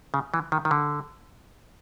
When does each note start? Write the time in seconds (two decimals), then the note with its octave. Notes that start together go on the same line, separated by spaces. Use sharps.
0.14 C#3
0.34 E3
0.52 D#3
0.65 D#3
0.71 D3